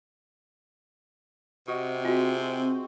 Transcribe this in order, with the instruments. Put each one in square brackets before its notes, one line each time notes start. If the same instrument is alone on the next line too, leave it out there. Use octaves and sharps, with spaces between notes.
[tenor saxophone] C3 [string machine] C4 [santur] F#4 D#5
[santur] G#3 C6 [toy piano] F4 F#4